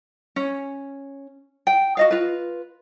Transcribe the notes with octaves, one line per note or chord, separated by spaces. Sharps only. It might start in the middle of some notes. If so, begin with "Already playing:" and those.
C#4
G5
F#4 D#5 F5
F4 B4